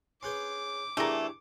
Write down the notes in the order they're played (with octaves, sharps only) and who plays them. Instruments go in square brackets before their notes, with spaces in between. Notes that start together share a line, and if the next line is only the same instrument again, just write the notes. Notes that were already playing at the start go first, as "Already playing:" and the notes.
[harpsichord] C#4 G#4 B4 [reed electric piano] C6 F#6 G6 [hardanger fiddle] D6
[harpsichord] E2 E3 G#4 [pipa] A3 A#4 [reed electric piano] D4 E4 G4